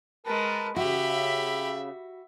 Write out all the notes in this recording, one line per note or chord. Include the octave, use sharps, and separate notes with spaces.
G#3 A#4 B4 A5
C#3 F#4 G4 E5 B5